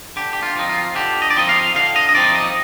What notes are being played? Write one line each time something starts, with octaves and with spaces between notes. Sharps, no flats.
D3 G4
G4
F4
F3 C4 D#4
F4
D3 G4
D#5
D5
F3 C4 D#4 D#5
F5
D3 F5
D#5
D#5
F3 C4 D#4 D5
D#5